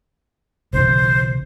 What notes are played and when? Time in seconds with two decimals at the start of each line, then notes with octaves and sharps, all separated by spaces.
0.73 B1 C#3 E3 C5